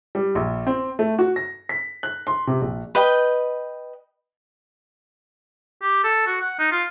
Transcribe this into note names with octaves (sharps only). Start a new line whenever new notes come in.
G3
A#1
C4
A3
F#4
A#6
B6
F#6
C6
C3
A#1
B4 D#5 G5
G4
A4
F#4
F#5
D#4
F4